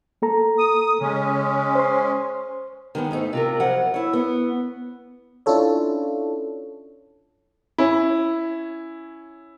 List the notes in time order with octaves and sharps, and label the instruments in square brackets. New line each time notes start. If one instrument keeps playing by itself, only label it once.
[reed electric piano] A#3 A4 A#5
[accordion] D#6
[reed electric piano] C#3 [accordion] G#3 C#4
[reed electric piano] C5 C6
[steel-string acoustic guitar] D#3 G#3 B3 C#4
G#2 A3 D#4
C3 F4 A#4
F2 F#3 F4 C5 F#5
E4 C#5
B3
[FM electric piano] C#4 D4 E4 F4 A4 C#5
[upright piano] C#4 E4